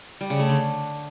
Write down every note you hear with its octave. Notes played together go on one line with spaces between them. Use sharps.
G3
C#3
A3
D3